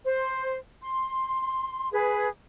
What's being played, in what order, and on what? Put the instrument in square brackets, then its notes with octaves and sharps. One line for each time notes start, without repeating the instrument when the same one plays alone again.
[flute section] C5
C6
G#4 B4